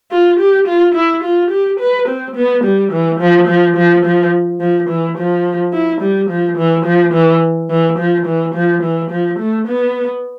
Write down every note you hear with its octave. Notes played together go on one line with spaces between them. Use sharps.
F4
G4
F4
E4
F4
G4
B4
C4
B3
G3
E3
F3
F3
F3
F3
F3
E3
F3
E4
G3
F3
E3
F3
E3
E3
F3
E3
F3
E3
F3
A3
B3